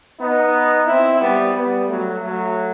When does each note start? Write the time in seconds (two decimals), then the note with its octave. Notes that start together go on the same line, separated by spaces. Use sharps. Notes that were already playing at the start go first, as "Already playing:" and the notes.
0.19 B3 D#4
0.87 C4 E4
1.20 G3 B3
1.53 G3 B3
1.87 F#3 A3
2.21 F#3 A3